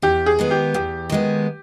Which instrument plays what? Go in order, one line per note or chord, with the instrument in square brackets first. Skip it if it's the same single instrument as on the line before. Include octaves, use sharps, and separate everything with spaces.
[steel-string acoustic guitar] E2 [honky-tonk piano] G4
[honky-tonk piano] G#4
[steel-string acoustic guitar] D#3 G#3 B3
[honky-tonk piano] G4
[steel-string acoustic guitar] E2 [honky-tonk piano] G4
[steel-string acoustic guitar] D#3 G#3 B3